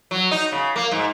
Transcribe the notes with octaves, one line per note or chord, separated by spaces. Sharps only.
F#3
D#4
C#3
A#3
G#2